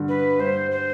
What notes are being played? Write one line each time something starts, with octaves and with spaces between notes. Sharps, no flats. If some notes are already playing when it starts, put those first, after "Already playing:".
Already playing: G2 D3
B4
G2 C5
C5